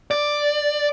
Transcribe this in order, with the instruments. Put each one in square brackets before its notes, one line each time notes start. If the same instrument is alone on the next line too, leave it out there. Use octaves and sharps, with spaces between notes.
[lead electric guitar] D5